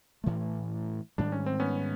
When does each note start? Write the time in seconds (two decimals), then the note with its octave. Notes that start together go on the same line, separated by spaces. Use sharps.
0.24 A2 E3 A3
1.18 G#2 D#3 G3 D4
1.32 C#4
1.46 C4
1.60 B3 C#4